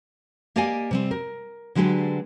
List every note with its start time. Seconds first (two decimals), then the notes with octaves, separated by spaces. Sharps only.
0.56 A#3 G4 D5 D#5 F5 G#5
0.91 C3 G3 C4
1.11 A#4
1.75 D3 F#3 G#3 D4 G4 B4